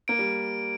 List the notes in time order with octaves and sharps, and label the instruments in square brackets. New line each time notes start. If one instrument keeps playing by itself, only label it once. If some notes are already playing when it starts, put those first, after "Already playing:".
[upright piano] A#3 [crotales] D7
[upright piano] G3